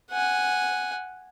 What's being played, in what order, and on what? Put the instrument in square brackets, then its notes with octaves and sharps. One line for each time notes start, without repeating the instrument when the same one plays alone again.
[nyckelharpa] F#5 G#5